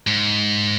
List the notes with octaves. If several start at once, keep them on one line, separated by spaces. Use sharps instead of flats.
G#2